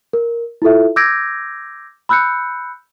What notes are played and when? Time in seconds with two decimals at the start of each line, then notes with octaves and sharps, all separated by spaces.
0.13 A#4
0.62 E4 F4 A4 E5
0.96 D6 E6 G6 G#6 A#6 D7
2.09 B5 E6 F#6 G6 C#7